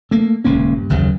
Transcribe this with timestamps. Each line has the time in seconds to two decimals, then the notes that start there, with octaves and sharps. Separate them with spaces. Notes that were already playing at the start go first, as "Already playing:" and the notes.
0.11 A3 A#3
0.44 D#1 C#2 A#3 C#4
0.75 G2
0.89 F#1 D#2 C#3 F#3